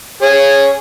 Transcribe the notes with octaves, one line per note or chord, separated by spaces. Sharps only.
G#4 C#5